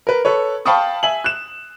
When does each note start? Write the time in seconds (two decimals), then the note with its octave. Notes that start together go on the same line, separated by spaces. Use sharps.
0.07 A#4 B4
0.25 A4 B4 C#5
0.65 F5 G5 A5 B5 C#6 D#6
1.03 E5 G#5 F#7
1.24 F#6 E7